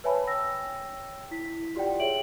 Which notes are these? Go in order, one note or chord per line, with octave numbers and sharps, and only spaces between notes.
B4 C#5 E5 G#5 A5 B5
C#5 G5 E6 A#6
E4 B6
F4 G4 D5 F#5 G5
G#4 C#5 E5 D7 F#7